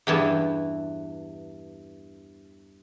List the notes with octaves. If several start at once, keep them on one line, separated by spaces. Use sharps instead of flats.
E2 G2 E3 A5